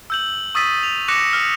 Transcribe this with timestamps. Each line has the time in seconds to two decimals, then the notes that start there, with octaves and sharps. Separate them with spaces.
0.10 E6 G6 F#7
0.55 C#6 D#6 E6 A6 B6 D#7
0.83 F7
1.08 C#6 D6 F#6 A#6 C#7 E7
1.33 F6